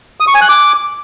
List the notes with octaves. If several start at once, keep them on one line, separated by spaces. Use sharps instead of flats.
D#6
C#6
G#5
F#6
D6